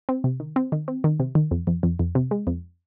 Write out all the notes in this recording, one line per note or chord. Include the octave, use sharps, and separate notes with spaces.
C4
C3
D#3
C4
D#3
C4
D#3
C3
D#3
F2
F2
F2
F2
C3
G#3
F2